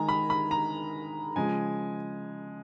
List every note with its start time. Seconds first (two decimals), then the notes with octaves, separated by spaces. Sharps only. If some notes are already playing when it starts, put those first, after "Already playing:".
Already playing: D#3 G#3 G#5 A#5
0.09 B5
0.30 B5
0.51 A#5
1.36 C#3 F3 G#3 G#5